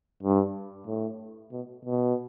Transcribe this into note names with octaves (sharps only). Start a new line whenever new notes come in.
G2
A2
B2
B2